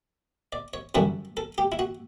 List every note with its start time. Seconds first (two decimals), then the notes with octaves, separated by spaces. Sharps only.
0.53 D5
0.74 C#5
0.95 F#2 D3 G3 C#4 E4 B4
1.37 A4
1.58 G4
1.72 E4
1.79 F#4